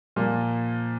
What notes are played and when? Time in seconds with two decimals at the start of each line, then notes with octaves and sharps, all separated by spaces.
0.16 A#2 F3 A#3